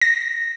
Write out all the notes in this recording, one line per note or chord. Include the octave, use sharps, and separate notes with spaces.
A#6